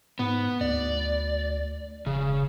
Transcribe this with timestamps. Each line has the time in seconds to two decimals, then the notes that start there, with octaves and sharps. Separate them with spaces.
0.19 G#2 B3
0.61 D2 D5
2.06 E1 C#3